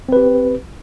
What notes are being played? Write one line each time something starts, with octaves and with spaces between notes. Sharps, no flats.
C4 G4 B4